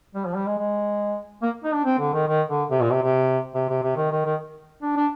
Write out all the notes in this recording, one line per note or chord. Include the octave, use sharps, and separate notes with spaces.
G3
F3
G3
G#3
G#3
A#3
D#4
D4
C4
D3
D#3
D#3
D3
C3
A#2
C3
C3
C3
C3
C3
D#3
D#3
D#3
D4
D4